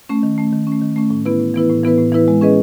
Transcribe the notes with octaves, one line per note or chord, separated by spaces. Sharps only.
A3 C#4
D#3
A3 C#4
D#3
C#4
A3
D#3
A3 C#4
A2
E3 B3 E4 B4
A2
E3 B3 E4 B4
A2
E3 B3 E4 B4
A2
E3 B3 E4 B4
G#3
C#4 G#4 B4 D#5